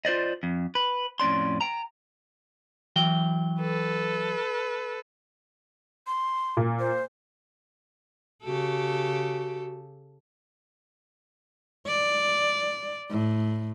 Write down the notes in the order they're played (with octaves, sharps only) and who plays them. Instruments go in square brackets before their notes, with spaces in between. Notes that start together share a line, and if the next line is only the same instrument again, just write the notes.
[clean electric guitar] F4 C5 D5 D#5
F2
B4
F2 A2 C#4 D5 C6
G5 A#5
E3 F#3 G5
[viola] A4 B4
[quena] C6
[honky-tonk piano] A#2
[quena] C5
[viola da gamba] C#3 G4 A4 [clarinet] F#4
[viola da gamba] D5
A2